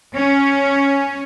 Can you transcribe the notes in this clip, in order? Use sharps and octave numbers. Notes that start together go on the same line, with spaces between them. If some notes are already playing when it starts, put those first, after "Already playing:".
C#4